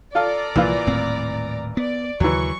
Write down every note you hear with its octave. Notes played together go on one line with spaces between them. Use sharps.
F4 A4 D5 F5 A#5
C2 A#2 E3 F3 A#3 F4
D#1 A2 C4
B3 D5
D#2 C#3 E3 F#3 C#6